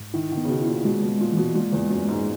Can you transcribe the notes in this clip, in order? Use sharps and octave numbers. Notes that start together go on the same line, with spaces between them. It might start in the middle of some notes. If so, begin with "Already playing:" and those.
Already playing: G#2
D#3 E4
D#3
B3
C#3
B2
E4
A#2
B2 G#3
B2
G#3
A#2
E3
B2
A#2 G#3
E2
G#3
F#2
G#3
G#2